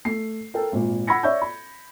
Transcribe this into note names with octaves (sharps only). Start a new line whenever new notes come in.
A3 C7
A4 A#4 G5
G#1 A#2
F#5 B5 E6 G#6 A#6 C#7
C#5 D5 E5 C#6 E6 G6
B5